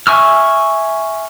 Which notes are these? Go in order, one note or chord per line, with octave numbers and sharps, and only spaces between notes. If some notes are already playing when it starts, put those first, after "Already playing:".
E5 G#5 C#6 E6 F6